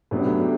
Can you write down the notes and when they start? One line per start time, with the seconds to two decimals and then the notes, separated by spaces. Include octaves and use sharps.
0.11 A2 F#3 B3 D4 G4
0.41 G4